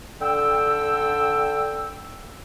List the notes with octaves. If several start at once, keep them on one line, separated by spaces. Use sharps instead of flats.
D3 G5 E6